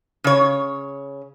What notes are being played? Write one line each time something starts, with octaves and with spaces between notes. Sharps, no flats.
C#3 C#5